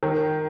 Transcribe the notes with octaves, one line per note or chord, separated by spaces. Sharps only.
D#3